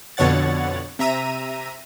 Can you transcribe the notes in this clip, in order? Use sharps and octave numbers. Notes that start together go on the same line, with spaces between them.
F2 B2 D3 C#5 F#5 A6
C3 E5 A#5 D#7